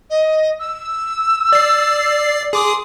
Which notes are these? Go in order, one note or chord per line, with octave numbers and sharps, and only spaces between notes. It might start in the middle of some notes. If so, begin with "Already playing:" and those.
D#5
E6
D5 C7
G#4 C6 D6 D#6